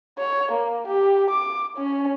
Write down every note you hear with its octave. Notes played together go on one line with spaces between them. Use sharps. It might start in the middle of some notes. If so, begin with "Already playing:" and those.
C#5
A#3
G4
D6
C#4